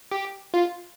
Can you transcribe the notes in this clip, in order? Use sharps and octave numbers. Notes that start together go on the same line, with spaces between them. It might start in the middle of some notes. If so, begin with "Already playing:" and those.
G4
F4